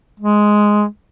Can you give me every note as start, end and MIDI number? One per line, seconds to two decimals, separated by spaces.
0.20 0.84 56